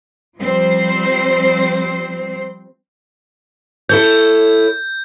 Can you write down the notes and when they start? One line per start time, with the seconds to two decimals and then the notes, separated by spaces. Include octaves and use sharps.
0.38 F3 G3 C4 C5
3.89 E4 A4 C#5 G6